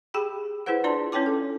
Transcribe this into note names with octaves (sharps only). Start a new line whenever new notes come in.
G4 G#4 G5 B5
E4 G#4 B4 C5 F#5
D4 F4 D5 A5 C6
C#4 E4 C#5 G5 A5 D6
A4